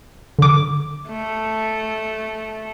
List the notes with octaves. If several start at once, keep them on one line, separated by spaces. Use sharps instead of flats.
D3 D6
A3